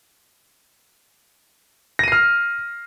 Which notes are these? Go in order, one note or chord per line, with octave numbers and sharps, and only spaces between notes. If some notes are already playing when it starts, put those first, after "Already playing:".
F6 A#6 C7 D#7